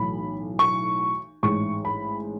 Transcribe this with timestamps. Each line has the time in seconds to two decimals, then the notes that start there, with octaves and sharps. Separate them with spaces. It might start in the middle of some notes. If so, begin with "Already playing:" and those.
Already playing: B1 A2 E3 B5
0.59 C#6
1.43 A1 G#2 G#3 C#6
1.85 B5